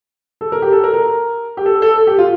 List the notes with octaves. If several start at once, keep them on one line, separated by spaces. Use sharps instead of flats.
A4
A#4
G4
A4
A#4
A#4
G4
A4
A4
A4
G4
F4